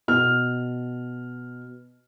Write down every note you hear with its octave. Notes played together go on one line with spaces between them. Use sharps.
B2 F6